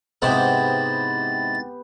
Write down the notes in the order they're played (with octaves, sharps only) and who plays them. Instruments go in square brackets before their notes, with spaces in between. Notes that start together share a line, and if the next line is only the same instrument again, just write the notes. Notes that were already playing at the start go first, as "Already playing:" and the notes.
[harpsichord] G#2 C3 E4 [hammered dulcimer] B3 G4 [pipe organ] A6